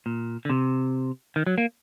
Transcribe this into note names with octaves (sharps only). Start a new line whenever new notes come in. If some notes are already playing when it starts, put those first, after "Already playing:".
A#2
D3
C3
D#3
F#3
A#3